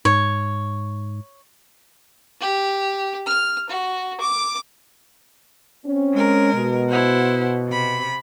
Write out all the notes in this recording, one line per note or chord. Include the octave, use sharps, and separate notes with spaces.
G#2 C#5
G4
F6
F#4
D6
C4 C#4
G#3 A#4
B2
E4 C5 F#5
C3 B5